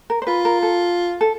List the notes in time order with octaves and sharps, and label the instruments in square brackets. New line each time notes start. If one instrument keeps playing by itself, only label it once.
[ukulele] A#4
C5
[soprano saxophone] F4 [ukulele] B4
[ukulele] A#4
A4
A4